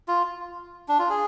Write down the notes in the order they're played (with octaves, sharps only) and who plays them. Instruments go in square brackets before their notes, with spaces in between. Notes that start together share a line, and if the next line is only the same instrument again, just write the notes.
[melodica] F4
D4
F4
G#4